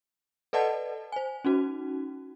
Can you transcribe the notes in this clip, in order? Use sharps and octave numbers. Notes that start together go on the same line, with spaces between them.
A4 B4 D5 D#5 F#5 A5
C5 G#5
C#4 D#4 F#4